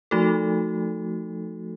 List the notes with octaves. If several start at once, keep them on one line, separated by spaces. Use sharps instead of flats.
F3 A3 D#4 F#4 A4